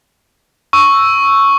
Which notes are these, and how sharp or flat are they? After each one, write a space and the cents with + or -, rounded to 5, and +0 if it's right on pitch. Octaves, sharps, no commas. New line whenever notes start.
C#6 +0 E6 +0